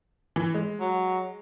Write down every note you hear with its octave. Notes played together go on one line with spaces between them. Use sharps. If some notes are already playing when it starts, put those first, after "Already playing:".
E3
G#3
F#3